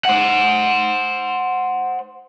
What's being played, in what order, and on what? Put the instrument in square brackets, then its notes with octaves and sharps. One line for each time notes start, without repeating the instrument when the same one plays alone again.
[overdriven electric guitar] C5 F#5